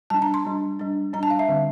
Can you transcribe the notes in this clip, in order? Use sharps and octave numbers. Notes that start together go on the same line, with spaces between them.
G3 D4 A5
A#5
C6
G3 D4
G3 D4
G3 D4 A#5
A5
F5
E5
D3 G3 C4